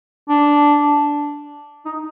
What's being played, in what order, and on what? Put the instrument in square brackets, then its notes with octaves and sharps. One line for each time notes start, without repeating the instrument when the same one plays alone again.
[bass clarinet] D4
D#4